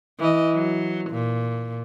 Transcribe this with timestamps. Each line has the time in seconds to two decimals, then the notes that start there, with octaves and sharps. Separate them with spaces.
0.19 E3 D#5
0.55 F#3
1.11 A#2